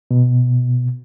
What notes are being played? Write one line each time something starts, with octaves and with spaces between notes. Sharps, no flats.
B2